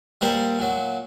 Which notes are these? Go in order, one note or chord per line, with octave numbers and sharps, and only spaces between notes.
A#2 G3 A#4 C5
A#2 F#3